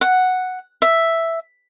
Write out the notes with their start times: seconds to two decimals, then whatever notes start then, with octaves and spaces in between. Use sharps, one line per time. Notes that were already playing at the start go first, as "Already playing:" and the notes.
0.01 F#5
0.82 E5